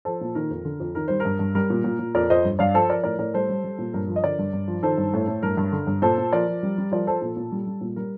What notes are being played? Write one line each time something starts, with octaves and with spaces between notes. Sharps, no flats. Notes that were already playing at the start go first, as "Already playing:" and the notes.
F3 A4 C5
A#2
D#3 A#4
F2
D3
F2
D#3 A#4
G3 C5
A#4
G2
G2
G3 A#4
A#2
A#2
A#2
F2 A#4 D5
F2 C5 D#5
G2
G2 D5 F5
F3 A4 C5
F3 A#4 D5
A2 A#4 D5
A2 A#4 D5
G3 A4 C5
G3
G3
A#2
G2 A#4
F3
D#5
D3 A#4 D5
G2
G2
F3
D#3 A4 C5
G2
A2
A2
G2 A#4
G2
D3
G2
A#2 A4 C5
A#2
F3 A#4 D5
F3
G3
G3
F3 A#4 D5
F3 A4 C5
A#2 A4
A#2
G3
G3
A#2
G3 A#4